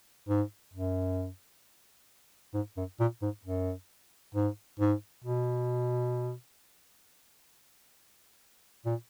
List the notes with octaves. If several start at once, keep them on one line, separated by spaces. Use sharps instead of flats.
G#2
F#2
G#2
F#2
A#2
G#2
F#2
G#2
G#2
B2
A#2